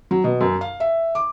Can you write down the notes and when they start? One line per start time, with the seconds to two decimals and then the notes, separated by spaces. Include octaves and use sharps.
0.11 F#3
0.24 B2
0.41 F#2
0.61 F5
0.80 E5
1.15 D6